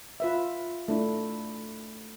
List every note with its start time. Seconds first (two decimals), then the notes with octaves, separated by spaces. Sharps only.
0.20 F4 B4 E5
0.88 A3 D4 E4